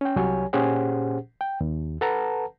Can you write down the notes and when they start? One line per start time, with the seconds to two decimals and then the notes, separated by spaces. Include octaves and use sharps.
0.01 C#4 G5
0.16 C2 F#3 G4 C#5 G#5
0.53 A#2 C#4 G4 G#4 C5 F#5
1.41 G5
1.61 D#2
2.01 A4 B4 F#5 A5 A#5